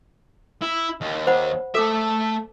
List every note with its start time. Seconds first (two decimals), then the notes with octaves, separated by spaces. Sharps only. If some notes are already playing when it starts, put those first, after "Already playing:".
0.62 E4
1.01 D#2
1.27 C5 F#5 B5
1.75 A3 A4 E5 D6